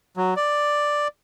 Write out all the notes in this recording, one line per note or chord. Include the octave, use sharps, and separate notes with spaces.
F#3
D5